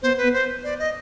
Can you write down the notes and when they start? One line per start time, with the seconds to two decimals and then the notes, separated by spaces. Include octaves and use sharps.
0.02 B3 C5
0.18 B3 B4
0.33 C5
0.64 D5
0.79 D#5